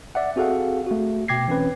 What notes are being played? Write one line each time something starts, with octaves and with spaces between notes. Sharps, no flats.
D5 E5 F#5
C4 F#4 G#4 A4 F5 F#5
A3 F#4
B2 G5 D6 G#6 A#6 C7
E3 C4 C#4 B4